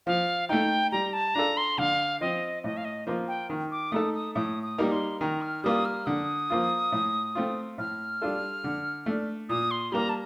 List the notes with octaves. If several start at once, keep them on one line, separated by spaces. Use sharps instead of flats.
F3 F5
A3 D#4 G5
G3 A#5
A5
D4 F4 A4 A#5
C6
D3 F5
F3 C4 D#5
A2 D#5
F5
D#5
F3 A#3 F4
G5
D#3
D6
A3 D#4 A4 D#6
D#6
A2 D#6
D#6
G3 A#3 D#4 A#4
C6
D#3 A#5
F6
G3 A#3 F4 D#6
F6
D3 D#6
F3 A#3 F4
A2
A3 C4 F4
A2 F6
G3 D4 F4 A4
D3
A3 D4
A#2 D#6
C6
G3 A#3 A#5
A5